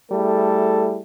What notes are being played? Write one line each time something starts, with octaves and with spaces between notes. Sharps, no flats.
G3 A3 E4 G#4 A4